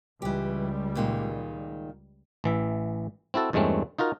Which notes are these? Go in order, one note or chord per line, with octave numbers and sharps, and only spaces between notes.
C#2 E3 G3 G4
A#2 D#3 G#3
A1 E3 E5
C4 E4 F#4 A4
E2 G2 G#3 A3 C4 C#4
D#4 F4 F#4 A#4